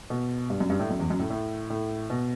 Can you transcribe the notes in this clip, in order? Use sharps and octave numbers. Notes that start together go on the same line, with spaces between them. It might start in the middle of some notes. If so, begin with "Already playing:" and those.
B2
G2
F#2
G2
A2
F#2
E2
F#2
A2
A2
A2
B2